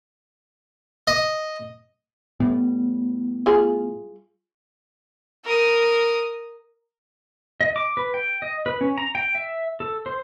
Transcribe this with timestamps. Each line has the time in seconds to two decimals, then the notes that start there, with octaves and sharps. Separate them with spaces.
1.07 D#5
2.40 A2 G3 B3
3.46 F4 G#4
5.44 A#4 D#6
7.61 D#5
7.76 D6
7.97 B4
8.14 G5
8.42 D#5
8.66 B4
8.81 C#4
8.98 A#5
9.15 G5
9.35 E5
9.80 A4
10.06 C5